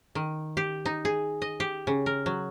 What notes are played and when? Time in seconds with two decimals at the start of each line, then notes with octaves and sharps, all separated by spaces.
0.15 D#3
0.57 G4
0.86 D#4
1.05 G#4
1.42 D#5
1.60 G4
1.87 C#3
2.06 A#4
2.26 F#3